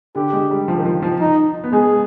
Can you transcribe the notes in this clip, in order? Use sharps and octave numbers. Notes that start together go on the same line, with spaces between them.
D3 G4
G#3
G3
F3
D#3
F3
F3
D#4
B3
G#3 G#4